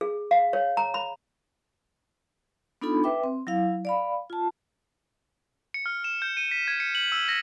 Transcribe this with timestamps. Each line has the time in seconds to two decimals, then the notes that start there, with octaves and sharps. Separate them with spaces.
0.01 G#4
0.31 F5
0.53 C#5
0.77 A#5
0.94 B5
2.82 B3 D4 D#4 F4 A4 B5
3.03 B4 E5 G5 D6
3.24 C4
3.47 F#3 E4 F5
3.85 D5 F5 B5
4.30 F4 A5
5.74 C#7
5.86 F6
6.04 E7
6.22 G6
6.37 D#7
6.51 B6
6.68 G#6
6.80 C#7
6.95 F#7
7.12 E6
7.29 A#6